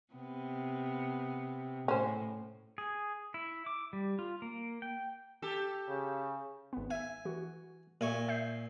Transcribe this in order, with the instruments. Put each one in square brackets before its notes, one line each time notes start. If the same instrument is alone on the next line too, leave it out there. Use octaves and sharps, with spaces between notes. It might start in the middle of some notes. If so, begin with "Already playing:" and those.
[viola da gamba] C3 B3
[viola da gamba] A2 [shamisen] C#4 C5
[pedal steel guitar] G#4
E4
D6
G3
F4
A#3
G5
[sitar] G4 A4
[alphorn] C#3
[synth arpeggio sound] G#1 B3
[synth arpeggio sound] E5 [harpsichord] G#5
[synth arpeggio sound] E3 F#4
[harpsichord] A#2 G#5 C#6 [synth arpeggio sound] E5
[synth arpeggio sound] E5 G6 C7